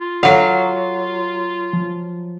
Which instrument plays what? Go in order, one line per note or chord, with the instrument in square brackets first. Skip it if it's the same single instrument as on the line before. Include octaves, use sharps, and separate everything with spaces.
[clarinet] F4
[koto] F#3 F5 [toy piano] A4 F#5
[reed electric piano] F3